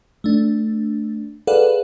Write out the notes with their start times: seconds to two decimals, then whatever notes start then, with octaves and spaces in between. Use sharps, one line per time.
0.24 A3 D4
1.47 G#4 A4 B4 D5 F5 F#5